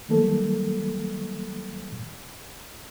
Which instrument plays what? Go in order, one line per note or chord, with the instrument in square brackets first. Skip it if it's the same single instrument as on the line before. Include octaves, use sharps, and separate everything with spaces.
[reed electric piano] D#3 F#3 G3 A3 A#3 A4